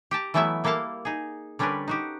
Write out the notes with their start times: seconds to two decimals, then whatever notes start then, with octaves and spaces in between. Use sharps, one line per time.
0.11 G4 G5 A5 A#5
0.34 E3 F#3 A3 B3 E4 E5
0.64 G3 A#3 E4 A4 F5 A5
1.05 D#4 G#4
1.59 D3 G3 C#4 D4 A#4 B4
1.88 D#4 F#4 G4